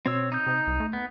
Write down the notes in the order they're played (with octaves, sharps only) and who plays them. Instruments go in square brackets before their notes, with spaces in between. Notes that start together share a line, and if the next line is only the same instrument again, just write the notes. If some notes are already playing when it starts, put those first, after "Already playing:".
[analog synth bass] B2 [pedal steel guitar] C4 C#5 E6
[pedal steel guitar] D#4 D#6 G6
[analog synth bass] C3
C2
A3
[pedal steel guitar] B3